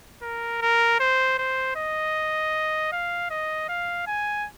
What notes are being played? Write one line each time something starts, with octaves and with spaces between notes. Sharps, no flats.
A#4
A#4
C5
C5
D#5
F5
D#5
F5
G#5